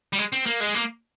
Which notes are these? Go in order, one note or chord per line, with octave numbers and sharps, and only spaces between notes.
G3
G#3
C4
A#3
G#3
A#3